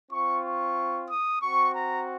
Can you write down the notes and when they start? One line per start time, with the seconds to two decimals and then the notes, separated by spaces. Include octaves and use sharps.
0.11 C4 F4 C#6
0.44 C#6
1.10 D#6
1.42 C4 F#4 C#6
1.74 A#5